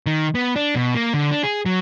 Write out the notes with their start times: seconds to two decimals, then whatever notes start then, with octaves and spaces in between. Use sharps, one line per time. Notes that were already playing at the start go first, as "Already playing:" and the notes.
0.06 D#3
0.35 B3
0.56 D4
0.75 B2
0.95 A#3
1.14 D3
1.31 D4
1.43 G#4
1.66 F#3